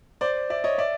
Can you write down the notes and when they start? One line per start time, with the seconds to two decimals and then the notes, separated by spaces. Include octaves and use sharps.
0.21 C5 D5
0.50 D5 E5
0.64 C#5 D#5
0.78 D5 E5